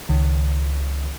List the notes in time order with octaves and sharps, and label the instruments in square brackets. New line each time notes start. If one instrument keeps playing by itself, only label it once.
[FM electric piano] C#2 D#3